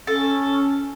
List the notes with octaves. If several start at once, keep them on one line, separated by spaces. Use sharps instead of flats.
C#4 A4